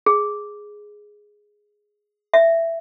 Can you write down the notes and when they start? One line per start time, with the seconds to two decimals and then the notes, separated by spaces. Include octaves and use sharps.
0.06 G#4
2.34 E5